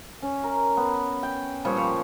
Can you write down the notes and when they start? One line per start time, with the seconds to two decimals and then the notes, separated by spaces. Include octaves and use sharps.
0.22 C#4
0.44 A#4
0.77 B3
1.23 G5
1.65 A#2 F3 G3 C#5
1.77 F3 C#5